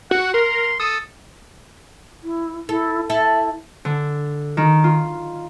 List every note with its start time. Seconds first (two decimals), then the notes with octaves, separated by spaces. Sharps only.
0.11 F#4 F#5
0.34 A#4 C6
0.80 A4 D#6
2.23 E4
2.69 E4 A4
3.10 E4 A4 E5
3.85 D3
4.57 D#3
4.84 F4